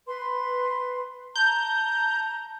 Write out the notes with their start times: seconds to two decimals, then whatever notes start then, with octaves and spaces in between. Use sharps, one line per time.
0.06 B4 C6
1.36 A5 A#5 G6